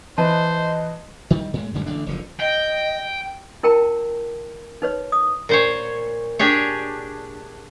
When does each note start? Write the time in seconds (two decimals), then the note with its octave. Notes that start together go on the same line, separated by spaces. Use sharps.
0.18 E3 B4 C5 D#5 A5
1.30 D#3 G3
1.54 A2 G#3
1.74 F#2 D3 G3 G#3
1.86 A1 D3 D4
2.06 F#1 D3 F3
2.40 D#5 G5
3.63 E4 A#4 G5 A5 A#5
4.82 D#4 B4 C#5
5.12 D#6
5.49 A#2 C5 C#5
6.39 D4 G4 G#4 C#5